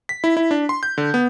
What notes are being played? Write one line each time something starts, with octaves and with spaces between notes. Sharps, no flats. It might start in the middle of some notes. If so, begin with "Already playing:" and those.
B6
E4
E4
D4
C6
G6
D3
B3